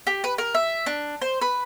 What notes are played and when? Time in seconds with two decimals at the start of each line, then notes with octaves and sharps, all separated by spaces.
0.07 G4
0.24 B4
0.38 A#4
0.54 E5
0.86 D4
1.22 C5
1.41 B4